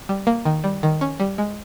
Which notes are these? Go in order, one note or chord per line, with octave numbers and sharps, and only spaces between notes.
G3
A#3
D#3
G3
D#3
C#4
G3
G#3